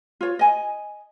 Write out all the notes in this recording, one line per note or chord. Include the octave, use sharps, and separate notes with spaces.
F4 C#5
D#5 G#5